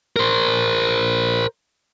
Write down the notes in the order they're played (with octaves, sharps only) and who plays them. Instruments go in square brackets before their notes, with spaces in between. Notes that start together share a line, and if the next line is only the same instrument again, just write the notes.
[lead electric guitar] A#4 C5